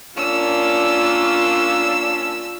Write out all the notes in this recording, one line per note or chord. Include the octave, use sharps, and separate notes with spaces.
A#3 C#4 D4 F4 E6